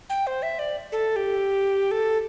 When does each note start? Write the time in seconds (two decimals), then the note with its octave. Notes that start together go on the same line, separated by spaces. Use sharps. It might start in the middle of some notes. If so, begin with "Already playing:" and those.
0.10 G5
0.27 C5
0.43 E5
0.59 D5
0.92 A4
1.16 G4
1.91 A4